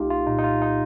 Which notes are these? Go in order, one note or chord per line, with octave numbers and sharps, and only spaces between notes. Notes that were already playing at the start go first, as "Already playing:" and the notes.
Already playing: C2 A3 D#4 F4 G4
F4
A#2 D#4
D#4
F4
D#4